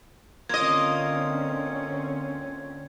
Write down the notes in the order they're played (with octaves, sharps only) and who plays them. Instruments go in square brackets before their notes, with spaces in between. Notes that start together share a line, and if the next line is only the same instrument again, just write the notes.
[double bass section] D3 C4 C#4 [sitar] A#3 D#5 [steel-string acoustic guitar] F4 [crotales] G#6